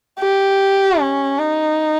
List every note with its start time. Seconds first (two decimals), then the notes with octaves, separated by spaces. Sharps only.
0.20 G4
1.00 C#4
1.39 D#4